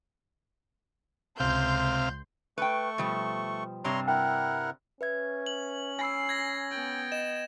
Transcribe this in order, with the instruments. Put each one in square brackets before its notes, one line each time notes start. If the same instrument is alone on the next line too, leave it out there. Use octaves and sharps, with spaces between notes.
[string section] C#2 C6 G6 [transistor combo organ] C3 F5
[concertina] A3 C#6 [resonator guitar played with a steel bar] B4 G5
[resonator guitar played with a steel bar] B2 F3 G3
[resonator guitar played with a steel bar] G2 C3 G3 [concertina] C#5 A#5 C6
[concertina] E4 A#4 F#5 [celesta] G5
[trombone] C#4 [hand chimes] B4 E5 G#6
[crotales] F#7
[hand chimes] G#5 B5 E6 [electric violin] C7
[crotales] G#6 A#6
[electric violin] B3 G5
[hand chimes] D#5 [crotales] E7